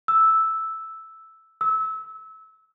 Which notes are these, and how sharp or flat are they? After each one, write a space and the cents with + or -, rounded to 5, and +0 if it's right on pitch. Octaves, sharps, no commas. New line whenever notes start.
E6 -5
E6 -25